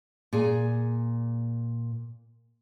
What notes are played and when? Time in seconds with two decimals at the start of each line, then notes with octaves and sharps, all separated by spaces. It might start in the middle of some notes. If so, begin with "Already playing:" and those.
0.33 A#2 G#4 G#5